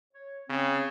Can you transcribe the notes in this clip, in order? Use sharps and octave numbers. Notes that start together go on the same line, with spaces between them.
C#5
C#3 C4